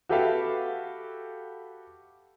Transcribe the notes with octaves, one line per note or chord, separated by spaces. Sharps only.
F#4 G4 A4 B4 E5 F5